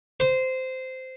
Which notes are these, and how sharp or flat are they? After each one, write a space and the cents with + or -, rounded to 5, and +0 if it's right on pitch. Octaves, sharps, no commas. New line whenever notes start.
C5 -15